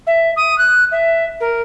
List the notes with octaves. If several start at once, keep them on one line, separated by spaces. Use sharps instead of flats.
E5
D#6
F#6
E5
A#4